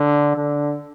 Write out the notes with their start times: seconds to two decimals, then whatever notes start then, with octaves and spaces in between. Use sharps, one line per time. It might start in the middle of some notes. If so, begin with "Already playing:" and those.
Already playing: D3
0.36 D3